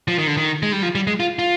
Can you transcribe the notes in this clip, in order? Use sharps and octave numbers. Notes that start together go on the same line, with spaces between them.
F3
D#3
D3
D#3
G#3
G3
F3
G3
G#3
F4
F4